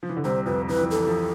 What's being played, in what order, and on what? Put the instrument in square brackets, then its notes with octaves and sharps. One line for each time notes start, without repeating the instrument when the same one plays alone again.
[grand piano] F3
E3
D3
[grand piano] C2 C3 [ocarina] C5
[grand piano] F2 F3 [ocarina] B4
[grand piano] E3 [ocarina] B4
[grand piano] F3
[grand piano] E3 [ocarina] A4
[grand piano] F3